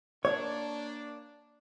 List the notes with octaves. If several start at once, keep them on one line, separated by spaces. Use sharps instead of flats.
A#3 D4 C#5